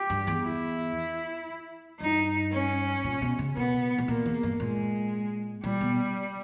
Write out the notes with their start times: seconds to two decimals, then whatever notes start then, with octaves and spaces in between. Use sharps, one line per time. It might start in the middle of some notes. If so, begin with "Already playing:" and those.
Already playing: G4
0.10 G2
0.27 E2
0.44 E4
2.00 G2 D#4
2.53 C#4
3.04 A#2
3.22 B2
3.39 C#3
3.56 B2 B3
3.98 B2
4.08 A#2 A#3
4.26 E2
4.43 G2
4.60 A#2 G#3
5.64 A#2 G3
5.81 B2